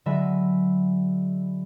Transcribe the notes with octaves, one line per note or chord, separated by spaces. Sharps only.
D3 F#3 G#3 E5 B5 D#7